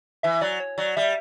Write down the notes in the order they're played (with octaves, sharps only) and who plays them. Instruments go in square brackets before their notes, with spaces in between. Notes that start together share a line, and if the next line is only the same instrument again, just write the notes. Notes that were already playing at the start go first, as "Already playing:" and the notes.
[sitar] E3 [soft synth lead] E5
[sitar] F#3 [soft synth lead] D5
[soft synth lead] C#5
[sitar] F#3 [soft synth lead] D5
[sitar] G3 [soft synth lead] E5